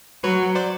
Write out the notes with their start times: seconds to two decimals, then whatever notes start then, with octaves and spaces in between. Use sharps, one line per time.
0.24 F#3 B4 C#5
0.55 C5 D5